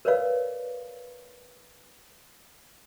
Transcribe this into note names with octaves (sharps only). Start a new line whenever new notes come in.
A#4 B4 C#5 D5 F5